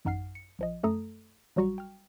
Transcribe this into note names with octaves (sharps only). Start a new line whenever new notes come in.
A1 F#2 D#4 F#5 F6 C7
C#7
A#1 F3 D#5
F#2 A3 A4 A#5 D#6
A1 F#3 G3 F#4 A#5 C#6
G5 F6